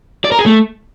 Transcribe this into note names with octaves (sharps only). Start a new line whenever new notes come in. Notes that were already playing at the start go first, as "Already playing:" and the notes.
D5
A#4
G#4
A3